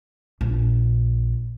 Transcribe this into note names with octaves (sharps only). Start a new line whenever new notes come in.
A#1